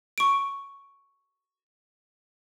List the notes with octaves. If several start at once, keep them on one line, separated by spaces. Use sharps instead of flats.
C#6 D7